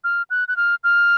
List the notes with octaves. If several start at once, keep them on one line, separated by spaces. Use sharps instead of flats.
F6
F#6
F#6
F6
F6